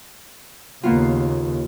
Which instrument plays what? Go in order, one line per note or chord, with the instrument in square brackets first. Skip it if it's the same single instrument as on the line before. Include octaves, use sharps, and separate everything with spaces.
[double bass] D#2 C#3 [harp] A#3 B3 F4